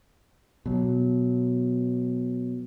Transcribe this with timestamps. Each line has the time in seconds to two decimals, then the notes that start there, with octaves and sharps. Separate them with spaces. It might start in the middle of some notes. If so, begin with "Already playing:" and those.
0.66 B2 F#3